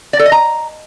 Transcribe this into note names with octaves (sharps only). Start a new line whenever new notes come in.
D5
A4
D#5
A#5